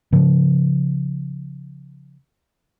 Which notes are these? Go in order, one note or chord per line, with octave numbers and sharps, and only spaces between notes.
C#3 F3